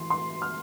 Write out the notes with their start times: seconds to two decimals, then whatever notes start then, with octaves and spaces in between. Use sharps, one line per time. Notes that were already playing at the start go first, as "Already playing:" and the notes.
Already playing: E3 C6
0.10 C6
0.42 F6